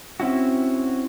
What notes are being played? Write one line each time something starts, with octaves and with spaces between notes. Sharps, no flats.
C4 C#4 E4 F#4